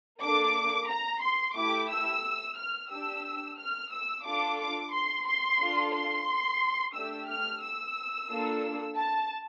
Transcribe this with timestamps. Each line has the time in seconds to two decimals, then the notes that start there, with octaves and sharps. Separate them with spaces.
0.21 A#3 D4 A4 D6
0.89 A#5
1.22 C6
1.56 A3 E4 G4 D6
1.90 E6
2.57 F6
2.91 D4 G4 E6
3.59 F6
3.92 E6
4.25 D4 F4 A4 D6
4.60 D6
4.93 C6
5.26 C6
5.60 D4 F4 A4
5.94 C6
6.95 A3 D4 G4 E6
7.29 F6
7.62 E6
8.30 A#3 D4 F4 A4
8.97 A5